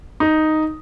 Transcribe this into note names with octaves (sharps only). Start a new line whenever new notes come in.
D#4